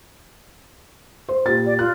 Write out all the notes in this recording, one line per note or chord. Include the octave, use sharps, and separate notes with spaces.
C5
A#2 G4 A6
D5
F4 F#6